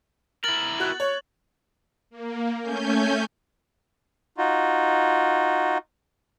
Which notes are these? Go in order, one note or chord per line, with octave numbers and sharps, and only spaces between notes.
E4 A#4 A6 F#7
F#4 F#6
C#5
A#3
A3 C#4 G#5 G6
D#4 F4 F#4